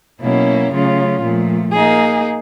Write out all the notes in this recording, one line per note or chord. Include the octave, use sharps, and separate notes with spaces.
B2 F#3 A#3 C#4 E4
C#3 F#3 A3 C#4 F4
A#2 F3 A3
A#3 D#4 G#4